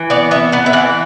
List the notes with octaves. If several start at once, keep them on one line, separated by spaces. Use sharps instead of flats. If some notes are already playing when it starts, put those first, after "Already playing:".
Already playing: E3
B3 D5
B3 E5
B3 F#5
E5
E3 F#5